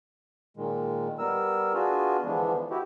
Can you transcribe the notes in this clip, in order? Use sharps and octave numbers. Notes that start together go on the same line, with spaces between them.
A#2 D#3 G#3
G3 B3 A#4 E6
B3 D4 F4 F#4 G#4
D3 E3 F3 G#3 B3 D4
E4 F#4 G4